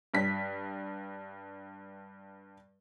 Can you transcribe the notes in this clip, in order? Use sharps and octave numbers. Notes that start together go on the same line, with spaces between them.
G2 B6